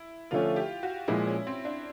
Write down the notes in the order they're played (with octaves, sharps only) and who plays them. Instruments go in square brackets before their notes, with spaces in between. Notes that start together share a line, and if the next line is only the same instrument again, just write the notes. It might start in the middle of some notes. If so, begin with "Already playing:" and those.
Already playing: [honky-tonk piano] E4
[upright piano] D3 F3 A3 C#4 [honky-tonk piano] F4
[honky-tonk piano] G4
F#4
[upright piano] A#2 F3 G#3 [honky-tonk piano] E4
[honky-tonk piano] C#4
C4
D4